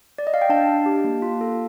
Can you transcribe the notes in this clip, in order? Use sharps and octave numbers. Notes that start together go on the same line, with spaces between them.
D5
D#5
F5
G5
D4 F5 A5
D4
G4
A#3
F4
A4